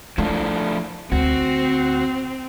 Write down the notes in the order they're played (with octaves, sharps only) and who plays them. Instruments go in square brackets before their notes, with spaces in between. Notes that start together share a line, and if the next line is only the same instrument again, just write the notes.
[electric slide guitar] F3 A3 D4 [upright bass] E4
[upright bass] D2 [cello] C4 [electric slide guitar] F#4